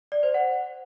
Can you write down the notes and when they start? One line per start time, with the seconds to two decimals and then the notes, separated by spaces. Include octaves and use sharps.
0.12 D5
0.23 C5
0.34 F#5